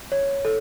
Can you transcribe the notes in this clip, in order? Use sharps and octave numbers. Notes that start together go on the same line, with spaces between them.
C#5
A4